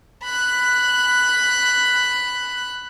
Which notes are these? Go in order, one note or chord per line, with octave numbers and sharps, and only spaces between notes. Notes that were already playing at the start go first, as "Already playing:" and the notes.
B5 F#6